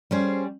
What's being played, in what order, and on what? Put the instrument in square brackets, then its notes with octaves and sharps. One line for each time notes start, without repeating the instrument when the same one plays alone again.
[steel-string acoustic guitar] G3 C#4 G#4 C5